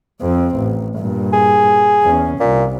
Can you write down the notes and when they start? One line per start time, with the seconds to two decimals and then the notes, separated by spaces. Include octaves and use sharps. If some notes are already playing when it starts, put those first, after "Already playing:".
0.22 F2 C4
0.57 A1
0.97 G2 A#2
1.33 G#4
2.03 E2 C#4
2.40 C2 A#2